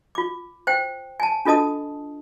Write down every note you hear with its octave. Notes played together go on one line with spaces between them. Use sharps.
F4 D6
C5 G5
G#5 A5
D4 F4 A4 D#5 A5 D#6